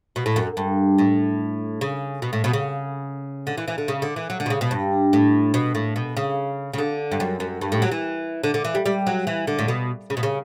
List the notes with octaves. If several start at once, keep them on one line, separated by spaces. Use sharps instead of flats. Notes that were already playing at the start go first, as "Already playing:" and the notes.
B2
A2
F#2
G2
A2
C#3
B2
A2
B2
C#3
D3
E3
E3
D3
C#3
D3
E3
F#3
D3
B2
C#3
B2
G2
A2
B2
A2
B2
C#3
C#3
D3
G2
F#2
F#2
G2
A2
F#3
E3
D3
D3
E3
G3
G3
F#3
E3
D3
A2
B2
C#3
B2
C#3